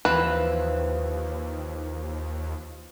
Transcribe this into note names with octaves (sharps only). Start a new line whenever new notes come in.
D#2 E3 F3 C4 B4